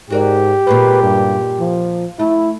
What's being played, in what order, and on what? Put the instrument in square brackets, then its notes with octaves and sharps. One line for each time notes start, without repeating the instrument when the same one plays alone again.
[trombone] G#2 [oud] F#4 A#4 D5 [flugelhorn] G4
[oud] A#2 G#3 C#4 [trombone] B4
[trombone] G2
F3
[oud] A3 [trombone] E4